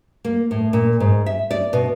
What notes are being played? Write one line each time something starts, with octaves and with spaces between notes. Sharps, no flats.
A#3
A2
A#2
G#2
E5
D5
B2